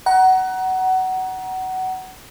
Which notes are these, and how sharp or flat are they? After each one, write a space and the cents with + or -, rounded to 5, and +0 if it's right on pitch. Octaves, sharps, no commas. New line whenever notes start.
F#5 +20 A#5 +25